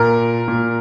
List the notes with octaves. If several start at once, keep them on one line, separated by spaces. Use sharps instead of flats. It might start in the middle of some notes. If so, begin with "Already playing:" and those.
Already playing: A#2 A#4
A#2